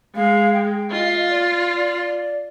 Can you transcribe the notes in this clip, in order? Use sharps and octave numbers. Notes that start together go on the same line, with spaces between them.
G#3 F5
G5
F4 D#5
F5
D#5
D5